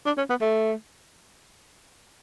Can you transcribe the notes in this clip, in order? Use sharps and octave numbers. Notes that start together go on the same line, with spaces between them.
D4
C#4
B3
A3